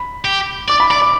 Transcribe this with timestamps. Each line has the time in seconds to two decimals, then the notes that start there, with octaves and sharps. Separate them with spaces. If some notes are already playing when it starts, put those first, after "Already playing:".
Already playing: B5
0.25 G4
0.68 D5 D6
0.80 B5
0.90 D5 B5
1.02 D6